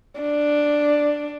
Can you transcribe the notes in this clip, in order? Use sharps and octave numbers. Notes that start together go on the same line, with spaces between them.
D4